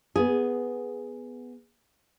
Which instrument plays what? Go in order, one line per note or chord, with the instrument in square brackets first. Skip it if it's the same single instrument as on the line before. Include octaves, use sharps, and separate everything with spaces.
[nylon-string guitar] B3 G#4